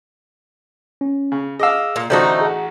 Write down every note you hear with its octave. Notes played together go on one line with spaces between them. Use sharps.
C#4
C#3
G#4 D#5 F5 D6 E6
A#2
A1 D3 A3 D#4 F#4 C5 D5 G6
G#4 F#5